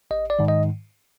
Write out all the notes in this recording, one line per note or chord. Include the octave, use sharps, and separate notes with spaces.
A1 D#5
D5
G#2 D#3
D#5